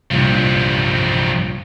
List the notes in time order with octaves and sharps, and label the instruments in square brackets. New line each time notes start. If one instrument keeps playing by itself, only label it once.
[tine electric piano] C2 A#2 [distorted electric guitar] G2 F3